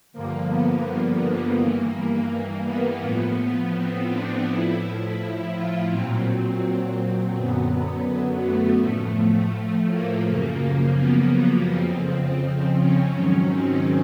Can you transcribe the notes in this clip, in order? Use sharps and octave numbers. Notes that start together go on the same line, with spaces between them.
G2 D3 F3 A#3
B3
A#3
G2 E3
B3
A2 F3
B3
C4
D4
A2 F3 E4
F4
A#2 F#3 C4
F#2 D3 F#3 B3
A3
A2 F3
A#3
F#2 C#3 F3
B3
F2 C#3 F3 C4
C#4
G#2 D#3 F#3
C4